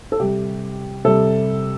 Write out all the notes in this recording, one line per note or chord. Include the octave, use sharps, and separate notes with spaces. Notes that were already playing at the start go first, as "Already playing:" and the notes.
A4
C3 G3 G4
C3 G3 A4